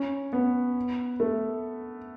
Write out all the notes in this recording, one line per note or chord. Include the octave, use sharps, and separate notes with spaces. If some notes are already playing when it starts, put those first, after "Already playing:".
Already playing: C#4
B3
A3